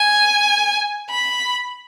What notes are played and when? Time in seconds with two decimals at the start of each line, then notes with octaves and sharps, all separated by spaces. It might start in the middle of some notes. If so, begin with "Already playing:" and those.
Already playing: G#5
1.10 B5